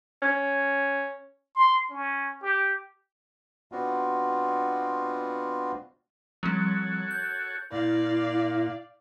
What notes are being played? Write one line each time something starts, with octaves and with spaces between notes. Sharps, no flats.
C#4
C6
C#4
G4
B2 B3 C4 D4 F4 F#4
F3 G3 C4 F#4 A4 C#5
G6
A#2 E4 D5 F5